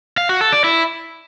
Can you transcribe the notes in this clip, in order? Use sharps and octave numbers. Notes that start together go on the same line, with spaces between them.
F5
F#4
A4
D5
E4